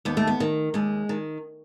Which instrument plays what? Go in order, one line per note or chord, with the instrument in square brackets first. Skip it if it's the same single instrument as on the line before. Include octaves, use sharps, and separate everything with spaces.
[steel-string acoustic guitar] D#2 B3
A3
B3
D#3
D#2 G#3
D#3